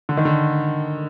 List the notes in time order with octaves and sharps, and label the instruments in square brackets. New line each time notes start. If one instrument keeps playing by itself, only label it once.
[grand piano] D3
D#3
D3